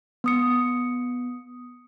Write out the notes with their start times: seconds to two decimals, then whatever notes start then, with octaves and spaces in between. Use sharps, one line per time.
0.24 B3 D#6 C#7